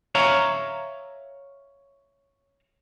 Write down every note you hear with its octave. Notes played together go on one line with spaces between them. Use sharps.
C#5 E5 F5 A#5